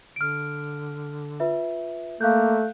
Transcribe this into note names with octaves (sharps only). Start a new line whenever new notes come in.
D3 F6 D7
F4 B4 E5
A3 A#3 F5 F#6 G6